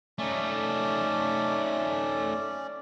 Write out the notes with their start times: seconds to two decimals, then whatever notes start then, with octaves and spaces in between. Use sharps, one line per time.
0.19 A3 C#4 D#4 D5